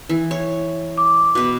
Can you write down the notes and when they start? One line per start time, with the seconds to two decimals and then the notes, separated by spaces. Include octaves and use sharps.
0.09 E3
0.31 C#5
0.98 D6
1.35 B2 B4